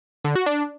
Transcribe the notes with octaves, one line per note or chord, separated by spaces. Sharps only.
D3
F#4
D4